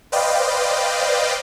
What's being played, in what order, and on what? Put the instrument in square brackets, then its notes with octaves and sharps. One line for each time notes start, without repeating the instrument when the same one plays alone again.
[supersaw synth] B4 C5 D5 D#5 F5 G5